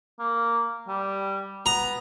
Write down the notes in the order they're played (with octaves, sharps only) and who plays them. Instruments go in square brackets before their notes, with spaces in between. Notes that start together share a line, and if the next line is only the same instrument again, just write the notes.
[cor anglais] A#3
G3
[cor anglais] B3 [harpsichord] A#5